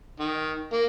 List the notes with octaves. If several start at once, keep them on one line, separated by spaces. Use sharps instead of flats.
D#3
A#3